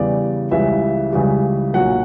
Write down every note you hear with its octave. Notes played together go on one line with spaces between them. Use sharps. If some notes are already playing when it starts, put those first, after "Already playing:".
Already playing: E2 C#3 E3 G3 D5
C#2 C#3 E3 G3 E5
C#2 C#3 E3 G3
B1 A#2 F#3 F#5